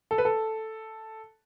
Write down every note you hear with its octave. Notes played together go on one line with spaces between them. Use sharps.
A4
B4
A4